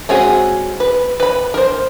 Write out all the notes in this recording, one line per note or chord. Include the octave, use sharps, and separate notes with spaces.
G#3 C4 C#4 F#4 G#4
B4
B4 B5
A#4 C5